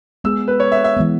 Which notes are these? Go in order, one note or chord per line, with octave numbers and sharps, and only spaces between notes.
G#3 B3 G#4 E6
B4
C#5
E5
E5
E3 G#3 B3